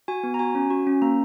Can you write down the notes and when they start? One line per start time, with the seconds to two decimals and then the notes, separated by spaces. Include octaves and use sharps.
0.08 F#4 G#5
0.24 B3
0.34 A#5
0.39 F#4 G#5
0.55 C#4
0.70 F#4
0.87 C#4
1.02 A#3 A#5